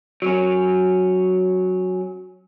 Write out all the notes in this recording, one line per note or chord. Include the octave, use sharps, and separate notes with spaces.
F#3 C#4